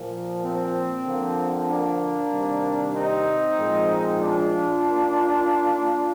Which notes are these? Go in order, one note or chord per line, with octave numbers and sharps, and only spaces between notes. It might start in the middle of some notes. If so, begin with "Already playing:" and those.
Already playing: A#2 F3 A#3
C4
D3 F3 A#3
A#3 D4
C3 D#3 G3
C4 D#4
A#2 F3 G#3
D4 F4
D#3 A#3